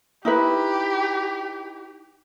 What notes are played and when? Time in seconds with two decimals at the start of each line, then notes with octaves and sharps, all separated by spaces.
0.25 D#4 E4 G4 B4